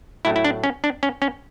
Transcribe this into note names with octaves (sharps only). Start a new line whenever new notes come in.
A2 F#3 A3 E4
E4
D4
C#4
D4
C#4
C#4